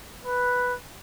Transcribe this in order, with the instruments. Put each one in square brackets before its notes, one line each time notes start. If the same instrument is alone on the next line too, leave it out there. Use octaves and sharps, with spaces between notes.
[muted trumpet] B4